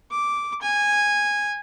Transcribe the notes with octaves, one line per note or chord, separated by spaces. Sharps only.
D6
G#5